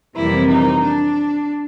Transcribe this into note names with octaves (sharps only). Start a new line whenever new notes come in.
F2 C3 E3 G3 A#3 E4
D#4
D4